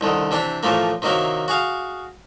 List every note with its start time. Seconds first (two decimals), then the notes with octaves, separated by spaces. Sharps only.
0.01 C2 D3 D#3
0.31 C3 E3 D4 G4
0.63 A2 E3 F3 A3 A#3
1.02 C3 D#3 F#3 A#3 E4
1.48 F#4 G#4 F5